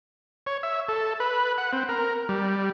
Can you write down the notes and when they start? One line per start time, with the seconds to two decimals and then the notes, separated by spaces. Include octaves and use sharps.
0.47 C#5
0.63 E5
0.89 A4
1.20 B4
1.58 F#5
1.73 C4
1.89 A#4
2.29 G3